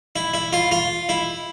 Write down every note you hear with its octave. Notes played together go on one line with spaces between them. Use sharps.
E4
E4
F4
F4
E4